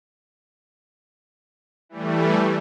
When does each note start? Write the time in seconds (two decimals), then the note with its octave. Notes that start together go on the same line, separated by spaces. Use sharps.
1.89 E3 G3 A3